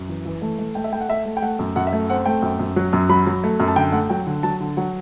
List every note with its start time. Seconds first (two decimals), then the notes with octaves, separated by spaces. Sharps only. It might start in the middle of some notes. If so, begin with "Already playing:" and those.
Already playing: F#2
0.09 E3
0.25 E3
0.42 A3
0.59 A3
0.75 A3 G5
0.84 E5
0.92 A3 G5
1.01 F#5
1.09 A3 E5
1.25 A3
1.37 G5
1.42 A3 F#5
1.59 F#2
1.76 F#2 F#5
1.87 E5
1.93 A3
2.10 C4 F#5
2.26 A3 G5
2.42 F#2
2.60 F#2
2.76 F#3
2.93 F#2
3.09 F#3 B5
3.27 F#3
3.44 A3
3.60 F#2
3.68 A5
3.76 D3 G5
3.93 A3 F#5
4.09 F#3 G5
4.27 D3
4.43 F#3 A5
4.61 D3
4.77 F#3 F#5